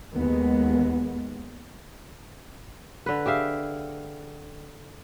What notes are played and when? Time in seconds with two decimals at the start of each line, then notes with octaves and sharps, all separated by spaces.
0.15 D#2 G#3 B3
3.06 D3 B4
3.26 G4 G#4 E5 F5